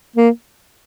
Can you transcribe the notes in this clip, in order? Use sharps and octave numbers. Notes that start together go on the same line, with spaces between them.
A#3